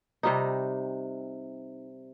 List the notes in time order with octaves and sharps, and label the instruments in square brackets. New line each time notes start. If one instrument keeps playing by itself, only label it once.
[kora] C3 G3 D#4